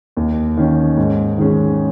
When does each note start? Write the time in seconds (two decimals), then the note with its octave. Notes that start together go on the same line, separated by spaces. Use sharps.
0.17 D#2
0.57 D#3 C#4
0.97 G#2
1.38 D#3 G#3 C#4